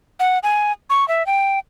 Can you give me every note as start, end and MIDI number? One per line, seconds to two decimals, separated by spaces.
0.20 0.38 78
0.43 0.72 80
0.90 1.07 85
1.08 1.25 76
1.26 1.59 79